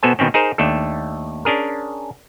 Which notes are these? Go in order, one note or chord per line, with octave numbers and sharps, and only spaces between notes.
B2 B3 A4 C5 G#5
B2 D#3 C4 C#4
D#4 G#4 A#4 C5
D#2 A3 D4 A4
C#4 D4 G#4 A#4